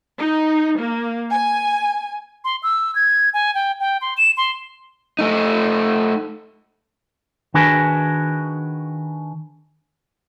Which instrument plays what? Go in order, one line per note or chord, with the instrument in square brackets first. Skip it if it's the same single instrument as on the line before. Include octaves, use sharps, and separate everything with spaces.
[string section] D#4
A#3
G#5
[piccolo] C6
E6
G#6
G#5
G5
G5
C6
E7
C6
[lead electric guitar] A3 D#4
[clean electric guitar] D#3 D4 F#4 G#4 A#4 B4